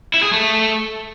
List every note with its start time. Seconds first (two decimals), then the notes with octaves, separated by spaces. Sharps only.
0.14 E4
0.23 G#4
0.32 A3